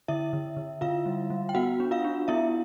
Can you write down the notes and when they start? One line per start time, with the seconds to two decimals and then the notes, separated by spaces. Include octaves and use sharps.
0.08 D3 E4 E5
0.33 D3
0.57 D3
0.81 D3 F4 F5
1.06 G3
1.30 G3
1.49 G5
1.55 B3 F#4 F#5
1.80 D4
1.91 F4 F5
2.04 D4
2.28 B3 E4 E5